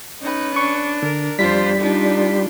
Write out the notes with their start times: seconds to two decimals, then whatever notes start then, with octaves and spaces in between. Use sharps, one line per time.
0.22 C#4 D#4 B4
0.56 D4 C#6
1.03 D3 A#4
1.39 F2 G3 D4 F4 C5 B6
1.80 D4 D#4 F4